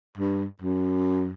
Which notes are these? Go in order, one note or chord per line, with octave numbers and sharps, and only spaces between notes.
G2
F#2